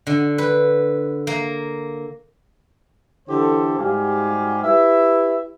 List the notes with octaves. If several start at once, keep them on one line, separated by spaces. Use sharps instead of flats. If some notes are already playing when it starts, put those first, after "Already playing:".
D3
B4
A#3
D3 E3 E4 G4 A4 C5
G#2 G3 F#4 G4 F5 G#5
E4 G4 B4 E5